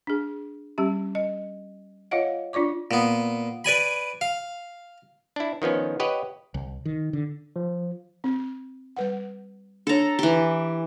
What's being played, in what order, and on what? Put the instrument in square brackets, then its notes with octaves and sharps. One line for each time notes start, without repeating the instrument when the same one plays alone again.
[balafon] D4 G#4
G3 C#4 G4
D#5
F4 C#5 D#5 F5 F#5
D4 F4 D5 C#6 D6
[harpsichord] A#2 B3
B4 D5 G#5 B5
F5
[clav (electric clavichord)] D4 E4
D#3 F3 B3 C#4
G4 B4 C#5 D#5 F#5
[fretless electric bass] C2
D#3
D3
[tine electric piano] F3
[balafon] C4
G3 B4 F#5
[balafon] D4 C#5 [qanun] A4 A#5
[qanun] E3 G4